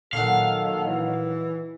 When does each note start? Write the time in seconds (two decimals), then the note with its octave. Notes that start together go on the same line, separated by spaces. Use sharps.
0.13 A#2 D#3 F#3 A4 F5 F#5
0.85 E3